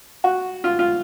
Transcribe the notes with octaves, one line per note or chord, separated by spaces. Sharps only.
F#4
F4
F4